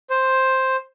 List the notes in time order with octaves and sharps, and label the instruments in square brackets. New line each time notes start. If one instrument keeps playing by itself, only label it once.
[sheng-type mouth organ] C5